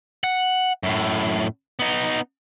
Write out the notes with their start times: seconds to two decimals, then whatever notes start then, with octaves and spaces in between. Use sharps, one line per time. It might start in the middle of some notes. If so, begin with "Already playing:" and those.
0.24 F#5
0.83 F#2 A2
1.79 B3 D#4